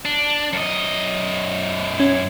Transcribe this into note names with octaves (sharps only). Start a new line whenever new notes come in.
D4
F#2 D#5
C#4